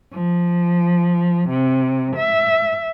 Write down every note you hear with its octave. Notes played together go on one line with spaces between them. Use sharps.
F3
C3
E5